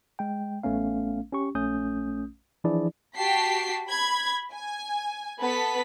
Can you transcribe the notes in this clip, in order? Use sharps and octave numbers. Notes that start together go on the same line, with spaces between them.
G#3 G5
A1 A3 B3 C#4 F5
C#4 G4 C#6
A#1 A3 C#4 D#6 G6
E3 F3 D4 E4 G#4 D5
F#4 G4 G5 A5 B6 C7
B5 G#6
G#5
B3 A4 B4 B6